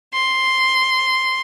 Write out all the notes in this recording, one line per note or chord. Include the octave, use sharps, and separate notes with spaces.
C6